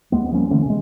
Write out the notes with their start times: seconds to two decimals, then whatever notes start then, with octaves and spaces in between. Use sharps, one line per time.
0.12 D#2 G#3 A#3 B3
0.32 F3 G3 A#3 C#4
0.50 D3 E3 A3 C#4
0.66 C3 G#3